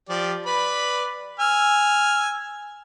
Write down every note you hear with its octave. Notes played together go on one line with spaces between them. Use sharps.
F3 G4 D5
B4 D5 B5
G#5 E6 F6